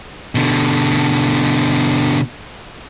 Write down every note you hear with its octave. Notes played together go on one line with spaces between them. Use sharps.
B2 D3